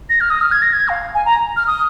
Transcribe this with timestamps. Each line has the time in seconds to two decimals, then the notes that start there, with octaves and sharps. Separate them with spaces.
0.10 A#6
0.21 F6
0.30 D#6
0.41 F6
0.52 G#6
0.62 A#6
0.73 G#6
0.89 F5
1.15 G#5
1.25 A#5
1.57 F6
1.67 D#6